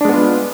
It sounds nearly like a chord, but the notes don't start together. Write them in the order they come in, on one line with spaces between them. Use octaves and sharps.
D4 G#3 B3 F4